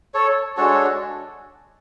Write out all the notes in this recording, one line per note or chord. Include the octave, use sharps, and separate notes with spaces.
A4 C#5
G#3 D4 F#4 A4 C#5